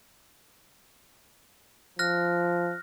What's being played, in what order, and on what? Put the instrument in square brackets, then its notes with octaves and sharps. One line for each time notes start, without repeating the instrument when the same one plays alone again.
[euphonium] F3 [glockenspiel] F6 F#6 A#6